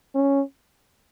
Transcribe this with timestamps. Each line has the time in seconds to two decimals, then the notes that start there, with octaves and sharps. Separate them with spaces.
0.15 C#4